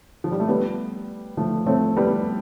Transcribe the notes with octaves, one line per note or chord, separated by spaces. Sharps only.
F3
G3
A3
G3 B3
F3 A3
A3 C4
G3 B3